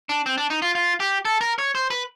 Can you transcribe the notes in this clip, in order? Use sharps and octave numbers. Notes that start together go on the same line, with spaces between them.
D4
C4
D4
D#4
F4
F4
G4
A4
A#4
C#5
C5
B4